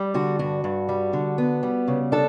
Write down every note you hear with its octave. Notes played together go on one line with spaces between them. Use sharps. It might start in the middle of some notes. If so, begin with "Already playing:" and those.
Already playing: G3
D3 F#4
G2 F#4
G2
G3
D3
B3
G3
C#3
D4 A4